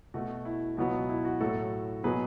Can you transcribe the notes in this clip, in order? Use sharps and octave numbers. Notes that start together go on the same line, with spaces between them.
B2 A3 F#4
E4
C#2 B2 F#3 B3 F#4
E4
F#4
A2 F#3 A3 F#4 A4
B2 F#3 B3 G#4 B4